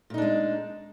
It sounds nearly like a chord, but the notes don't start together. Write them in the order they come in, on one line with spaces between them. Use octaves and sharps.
A#2 D#4 D4 G#3